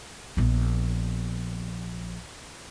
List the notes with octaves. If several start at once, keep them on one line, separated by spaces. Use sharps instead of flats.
A#1 B3